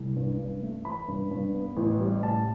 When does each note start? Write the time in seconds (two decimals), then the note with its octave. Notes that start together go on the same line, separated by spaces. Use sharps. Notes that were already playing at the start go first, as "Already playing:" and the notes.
Already playing: C2
0.16 G2
0.39 G2
0.62 A3
0.84 E3 B5
1.08 G2
1.31 G2
1.54 B3
1.77 A1
2.00 G3
2.23 A2 A5